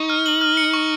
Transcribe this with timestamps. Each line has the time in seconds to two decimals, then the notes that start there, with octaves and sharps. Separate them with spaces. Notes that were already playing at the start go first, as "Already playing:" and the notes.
Already playing: D#4 C#6
0.10 F6
0.26 F#7
0.41 F6
0.57 C#7
0.74 C#6